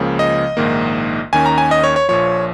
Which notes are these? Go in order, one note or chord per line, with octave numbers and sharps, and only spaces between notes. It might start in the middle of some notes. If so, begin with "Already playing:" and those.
Already playing: C#2 C#3 F3 A#3
D#5
A#1 G#2 D#3 A#3
D#2 D#3 C#4 G#5
A#5
G#5
D#5
C#5
C#5
A#1 A#2 F3 C#5